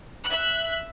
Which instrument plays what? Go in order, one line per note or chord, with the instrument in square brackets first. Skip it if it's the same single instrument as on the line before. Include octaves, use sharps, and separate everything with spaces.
[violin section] E5 F#6